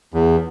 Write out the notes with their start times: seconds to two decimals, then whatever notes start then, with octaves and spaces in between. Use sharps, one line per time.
0.14 E2